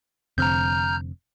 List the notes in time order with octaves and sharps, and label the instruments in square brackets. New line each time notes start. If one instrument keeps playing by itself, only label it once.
[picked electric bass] F1 D3 C4 [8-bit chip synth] A#5 F6 G6